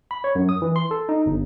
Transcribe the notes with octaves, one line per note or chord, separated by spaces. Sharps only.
B5
C#5
F#2
D#6
E3
C6
A4
D#4
G1